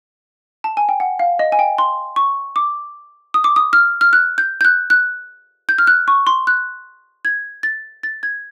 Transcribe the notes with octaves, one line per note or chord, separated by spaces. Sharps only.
A5
G#5
G5
F#5
F5
D#5
G#5
G5
C6
C#6
D6
D#6
D6
D#6
F6
F6
F#6
G6
G6
F#6
F#6
G6
F6
F#6
C#6
C6
F#6
G#6
A6
A6
G#6